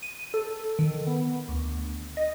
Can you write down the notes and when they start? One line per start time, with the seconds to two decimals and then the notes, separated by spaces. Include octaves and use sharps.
0.03 D#7
0.34 A4
0.79 D#3
1.07 B3
1.49 D2
2.17 D#5